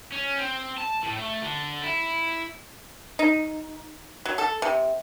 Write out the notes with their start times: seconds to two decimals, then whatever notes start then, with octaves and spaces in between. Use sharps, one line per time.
0.12 C#4
0.38 C4
0.78 A5
1.03 A2
1.16 A3
1.42 D3
1.83 E4
3.19 D#4
4.25 F#3
4.38 A4
4.62 C3